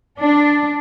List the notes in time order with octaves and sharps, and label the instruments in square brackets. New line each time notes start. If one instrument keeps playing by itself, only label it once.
[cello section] D4